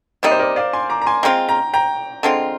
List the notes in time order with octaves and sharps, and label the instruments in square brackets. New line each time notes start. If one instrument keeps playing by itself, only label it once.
[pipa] C3 G3 A#3 D#4
[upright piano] C5
A#4 D5
D5 F5
G#5 C6
A#5 D6
A#5
G#5 C6
[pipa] G#3 C4 F4 [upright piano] G5 A#5
[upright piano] G5 A#5
G5 A#5
[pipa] D3 G#3 C4 F4